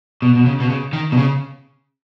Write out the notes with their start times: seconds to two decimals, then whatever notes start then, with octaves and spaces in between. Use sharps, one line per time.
0.22 B2
0.35 B2
0.46 C#3
0.60 B2
0.70 C#3
0.93 D#3
1.12 B2
1.17 C#3